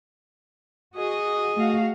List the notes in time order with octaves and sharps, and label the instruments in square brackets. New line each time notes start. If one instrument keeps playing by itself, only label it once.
[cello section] F#4 [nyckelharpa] G#4 D#5
[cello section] A3 F#4 F5